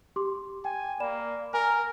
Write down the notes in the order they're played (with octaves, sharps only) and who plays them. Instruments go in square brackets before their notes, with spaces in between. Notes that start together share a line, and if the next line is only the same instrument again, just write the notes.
[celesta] G4 C6 D6
[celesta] G5 [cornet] G#5
[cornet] A#3 [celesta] D5 B5 E7
[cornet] A#4 [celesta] G#5